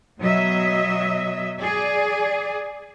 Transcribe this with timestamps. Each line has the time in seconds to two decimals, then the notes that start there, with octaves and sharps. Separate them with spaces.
0.20 B2 F#3 D#5 E5
1.59 G#4 D5